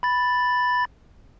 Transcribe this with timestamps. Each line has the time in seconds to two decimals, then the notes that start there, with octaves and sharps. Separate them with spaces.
0.03 B5 A6